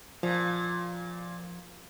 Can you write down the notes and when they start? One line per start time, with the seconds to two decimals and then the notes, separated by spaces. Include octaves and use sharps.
0.23 A#2 F3